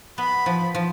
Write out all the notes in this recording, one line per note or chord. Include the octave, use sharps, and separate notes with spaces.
B3 B5
F3
F3